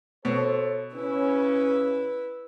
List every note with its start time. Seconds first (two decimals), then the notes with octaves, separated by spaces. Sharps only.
0.25 B2 A4 C5 C#5
0.94 C#3 C#4 E4 B4